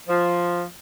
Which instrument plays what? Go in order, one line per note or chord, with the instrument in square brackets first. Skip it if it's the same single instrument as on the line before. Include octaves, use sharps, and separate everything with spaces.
[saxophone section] F3